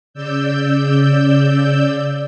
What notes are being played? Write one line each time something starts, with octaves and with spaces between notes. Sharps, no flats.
C#3 D5 E6 G6